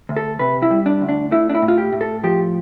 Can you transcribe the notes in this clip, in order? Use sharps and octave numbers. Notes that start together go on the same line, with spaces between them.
D2
A4
C3 B4
E4
G3
D4
D2
D4
A3 E4
D4
E4
A2
F4
G4
A2
A4
F3 G4